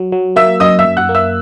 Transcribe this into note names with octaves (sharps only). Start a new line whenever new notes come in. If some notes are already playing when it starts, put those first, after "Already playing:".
Already playing: F#3
F#3
A#3 E5 E6
F#2 D#5 D#6
E5 E6
F#2
F#5 F#6
A#3
E5 E6